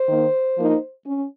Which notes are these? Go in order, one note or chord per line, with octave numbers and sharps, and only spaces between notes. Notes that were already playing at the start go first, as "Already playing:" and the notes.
Already playing: C5
D#3 A#3 D#4
F3 A#3 D#4
C#4